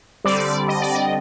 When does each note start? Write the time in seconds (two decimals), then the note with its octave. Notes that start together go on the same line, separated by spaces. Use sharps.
0.24 D3 G3 C4 D5
0.40 D5
0.68 D#5
0.82 D5
0.95 D#5